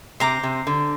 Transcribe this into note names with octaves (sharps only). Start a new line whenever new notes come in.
C3 C5 A#5 D6
C3
D3